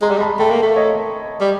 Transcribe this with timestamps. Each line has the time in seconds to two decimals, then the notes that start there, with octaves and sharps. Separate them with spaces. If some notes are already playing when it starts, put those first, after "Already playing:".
0.02 G#3 A#5 C6
0.10 G3
0.18 G#3
0.20 A5 B5
0.39 A3 G5 A5
0.51 A#3
0.63 A3
0.76 C#5 D#5
1.41 G3